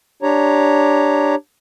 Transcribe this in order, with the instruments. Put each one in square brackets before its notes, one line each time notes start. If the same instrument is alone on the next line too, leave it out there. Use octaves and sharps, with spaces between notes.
[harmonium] D4 G4 C#5 A#5